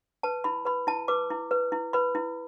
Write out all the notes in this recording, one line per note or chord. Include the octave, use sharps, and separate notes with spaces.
B4 A5
E4 B5
B4 B5
E4 A5
B4 D6
E4
B4
E4
B4 B5
E4